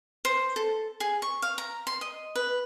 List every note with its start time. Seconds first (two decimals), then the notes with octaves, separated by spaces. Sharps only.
0.25 C5
0.56 A4
1.00 G#4
1.22 C#6
1.42 F5
1.58 A#5
1.87 C6
2.01 D#5
2.35 B4